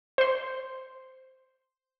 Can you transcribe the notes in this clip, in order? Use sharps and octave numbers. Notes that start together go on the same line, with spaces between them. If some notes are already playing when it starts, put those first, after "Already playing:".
C5 C6